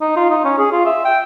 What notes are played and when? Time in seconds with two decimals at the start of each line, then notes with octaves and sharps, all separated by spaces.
0.01 D#4
0.16 F4
0.30 D#4
0.45 C#4
0.58 G#4
0.72 F4
0.86 E5
1.05 G5